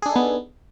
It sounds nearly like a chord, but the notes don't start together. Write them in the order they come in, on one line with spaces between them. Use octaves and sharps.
G#4 D4 A4 D#4 B3